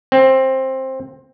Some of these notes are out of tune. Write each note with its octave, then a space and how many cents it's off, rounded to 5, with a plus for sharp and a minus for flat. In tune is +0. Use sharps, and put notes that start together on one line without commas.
C4 +15